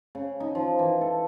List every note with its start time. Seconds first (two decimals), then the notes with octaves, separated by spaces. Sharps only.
0.15 C#3
0.40 D#4
0.55 F3
0.79 E3
1.01 A4